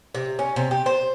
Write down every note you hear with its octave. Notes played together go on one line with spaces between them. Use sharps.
C3
C#4
C3
G4
C5